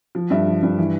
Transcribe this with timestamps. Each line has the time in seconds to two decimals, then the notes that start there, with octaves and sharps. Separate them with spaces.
0.15 F3
0.30 G2 E5
0.47 F3
0.63 G2
0.78 E3